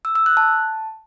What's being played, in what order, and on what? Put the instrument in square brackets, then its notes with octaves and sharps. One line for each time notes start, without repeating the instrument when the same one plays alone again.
[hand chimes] E6
E6
F#6
A5